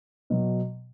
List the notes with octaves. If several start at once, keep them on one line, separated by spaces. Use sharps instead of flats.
B2 F#3